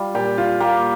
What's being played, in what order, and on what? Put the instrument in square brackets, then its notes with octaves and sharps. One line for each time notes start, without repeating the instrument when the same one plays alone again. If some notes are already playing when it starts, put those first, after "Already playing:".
Already playing: [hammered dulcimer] G3 [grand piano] F4
[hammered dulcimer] A#2 [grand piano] G4
[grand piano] F4
[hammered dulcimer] A#3 [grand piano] G4